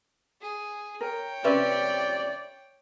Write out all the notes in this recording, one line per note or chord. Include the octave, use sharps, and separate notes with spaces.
G#4
A#4 C#5 G5
C3 C#4 B4 D5 E5